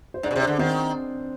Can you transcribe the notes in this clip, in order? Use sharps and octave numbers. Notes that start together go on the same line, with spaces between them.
C5
G#2 D4 D5
B2
C3 C5
D4 D5
D3
D#3 C4 C5